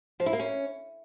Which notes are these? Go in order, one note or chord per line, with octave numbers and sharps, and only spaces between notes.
F3
E4
A#3
C#4